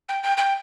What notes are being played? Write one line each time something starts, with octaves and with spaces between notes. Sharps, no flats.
G5
G5
G5